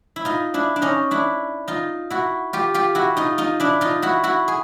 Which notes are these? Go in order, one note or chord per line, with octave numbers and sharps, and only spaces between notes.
E4
D#4 F4
D4 E4
D4
C#4 D#4
D4 E4
D#4 F4
E4 F#4
F4 G4
F4 G4
E4 F#4
D#4 F4
D#4 F4
D4 E4
D#4 F4
E4 F#4
E4 F#4
G#4